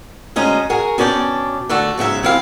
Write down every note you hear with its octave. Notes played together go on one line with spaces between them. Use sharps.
D2 G#3 C#4 C5 D#5 A#5
F#4 G#4 A#4
B2 C#4 D4 D5 F#5 G5
D3 A3 F#4 A4
G#2 C#3 F#3 E5
E3 C4 E4 G4 F5